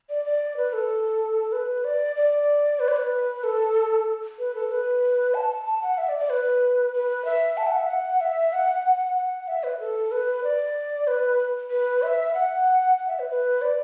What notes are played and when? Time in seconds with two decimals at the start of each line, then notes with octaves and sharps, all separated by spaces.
0.09 D5
0.25 D5
0.57 B4
0.73 A4
1.52 B4
1.84 D5
2.16 D5
2.80 B4
2.88 D5
2.97 B4
3.44 A4
4.39 B4
4.55 A4
4.71 B4
5.34 A5
5.66 A5
5.82 F#5
5.98 E5
6.09 D5
6.19 D5
6.30 B4
6.94 B4
7.25 E5
7.57 A5
7.67 F#5
7.77 E5
7.87 F#5
8.21 E5
8.53 F#5
9.17 F#5
9.48 E5
9.64 B4
9.80 A4
10.12 B4
10.44 D5
11.07 B4
11.71 B4
12.02 E5
12.34 F#5
12.98 F#5
13.08 E5
13.19 B4
13.30 B4
13.62 D5